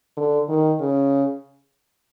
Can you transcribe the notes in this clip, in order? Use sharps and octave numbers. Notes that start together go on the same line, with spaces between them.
D3
D#3
C#3